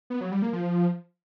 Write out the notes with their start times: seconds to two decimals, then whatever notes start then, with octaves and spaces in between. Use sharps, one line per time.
0.10 B3
0.21 F#3
0.32 G3
0.42 A#3
0.53 F3